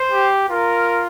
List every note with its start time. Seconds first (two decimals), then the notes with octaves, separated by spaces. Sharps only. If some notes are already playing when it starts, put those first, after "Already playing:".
Already playing: C5
0.12 G4
0.49 F4 A#4